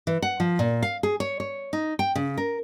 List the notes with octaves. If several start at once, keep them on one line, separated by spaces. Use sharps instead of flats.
E3
F#5
F3
A#2
F5
G#4
C#5
C#5
D#4
G5
C#3
A#4